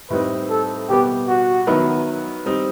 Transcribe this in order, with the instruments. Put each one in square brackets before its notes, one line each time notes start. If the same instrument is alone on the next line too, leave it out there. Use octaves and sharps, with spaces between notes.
[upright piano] A2 G3 C4 D#4 [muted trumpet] B4
[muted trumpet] A4
[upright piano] B2 G3 B3 [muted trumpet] G4
[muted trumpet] F#4
[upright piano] D#3 F#3 B3 E4 B4
G3 C4 D#4